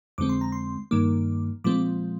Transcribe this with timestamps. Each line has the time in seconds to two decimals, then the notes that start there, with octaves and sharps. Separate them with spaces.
0.18 F2 D3 G#3 C4 D6
0.29 C6
0.41 A#5
0.52 C6
0.91 G2 D#3 A#3 D6
1.64 A#2 F3 G#3 C4 D6